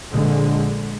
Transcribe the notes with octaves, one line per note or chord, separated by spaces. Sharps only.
A#1 D3 G#3